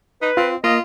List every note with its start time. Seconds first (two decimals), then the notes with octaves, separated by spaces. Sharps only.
0.22 D#4 B4
0.37 C4 F4
0.64 A#3 F4 D#5